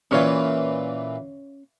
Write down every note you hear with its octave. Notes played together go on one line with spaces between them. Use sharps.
A#2 E3 C#4 F4 C#5